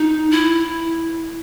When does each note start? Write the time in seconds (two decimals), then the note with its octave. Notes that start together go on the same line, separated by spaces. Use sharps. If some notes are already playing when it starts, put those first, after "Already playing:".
Already playing: D#4
0.31 E4